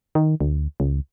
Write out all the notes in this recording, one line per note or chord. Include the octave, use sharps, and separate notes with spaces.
D#3
D2
C#2